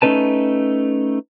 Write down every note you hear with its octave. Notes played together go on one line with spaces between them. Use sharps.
A3 C#4 D#4 B4 A5